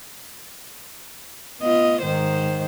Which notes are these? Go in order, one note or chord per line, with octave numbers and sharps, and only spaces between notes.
B3 F4 D#5
G#2 D#3 C5